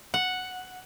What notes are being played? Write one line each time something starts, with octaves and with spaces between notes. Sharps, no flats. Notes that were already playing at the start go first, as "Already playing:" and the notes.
F#5